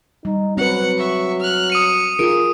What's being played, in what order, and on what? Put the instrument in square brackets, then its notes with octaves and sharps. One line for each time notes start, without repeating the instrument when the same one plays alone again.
[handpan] G3 [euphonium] D#4
[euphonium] F#3 [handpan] C4 B4 [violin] F#5 C#7
[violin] E5 C#6
F6 F#6
[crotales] D#6 D#7 [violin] C#7
[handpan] F4 G#4 A#4 [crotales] D7